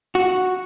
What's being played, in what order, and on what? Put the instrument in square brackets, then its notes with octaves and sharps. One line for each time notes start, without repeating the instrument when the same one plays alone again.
[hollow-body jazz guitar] F#4